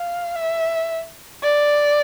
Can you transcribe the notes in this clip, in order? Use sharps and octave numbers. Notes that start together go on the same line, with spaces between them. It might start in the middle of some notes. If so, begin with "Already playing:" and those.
Already playing: F5
E5
D5